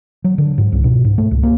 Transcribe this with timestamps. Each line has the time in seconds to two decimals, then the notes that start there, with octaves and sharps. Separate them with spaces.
0.24 F#3
0.38 D3
0.58 G#2
0.72 C2
0.84 B2
1.04 G#2
1.18 A3
1.31 C#2
1.43 A#3